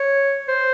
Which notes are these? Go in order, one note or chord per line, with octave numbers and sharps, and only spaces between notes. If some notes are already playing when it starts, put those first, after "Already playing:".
Already playing: C#5
C5